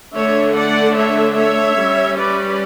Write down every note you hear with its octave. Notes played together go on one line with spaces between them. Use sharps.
D3 A3 D4 C#5 E5
D5 F#5
C#5 E5
C#5 E5
G3 C#4
B4 D5